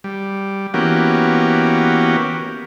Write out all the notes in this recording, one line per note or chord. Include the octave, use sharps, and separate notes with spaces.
G3
E3 A#3 B3 C#4 F#4 G4